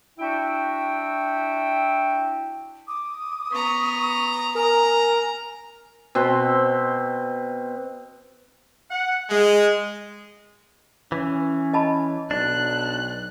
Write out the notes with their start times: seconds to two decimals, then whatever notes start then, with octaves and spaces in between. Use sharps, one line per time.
0.19 D4 E4 F#4 E5 G5
2.88 D6 D#6
3.52 B3 A#5 C#6
4.55 A#4 G#5 A#5
6.15 B2 C4 B5 C6
8.90 F#5
9.29 G#3
11.12 E3 C#4
11.73 D#5 A5 B5
12.31 B1 D4 F#6